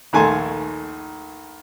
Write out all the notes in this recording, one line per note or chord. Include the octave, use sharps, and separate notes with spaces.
A#1 D#2 A3 G#5 A5 C6